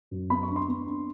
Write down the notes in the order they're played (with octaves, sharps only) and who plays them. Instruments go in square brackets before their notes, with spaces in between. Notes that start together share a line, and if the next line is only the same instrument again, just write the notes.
[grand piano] F#2
B3 B5
C#6
D4
C6
B3
D4